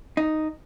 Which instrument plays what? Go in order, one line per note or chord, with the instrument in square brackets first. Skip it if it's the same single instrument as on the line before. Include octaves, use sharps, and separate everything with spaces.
[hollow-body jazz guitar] D#4